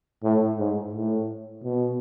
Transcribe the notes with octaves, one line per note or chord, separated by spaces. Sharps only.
A2
G#2
A2
B2